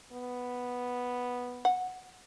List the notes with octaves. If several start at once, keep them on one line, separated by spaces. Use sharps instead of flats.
B3
F#5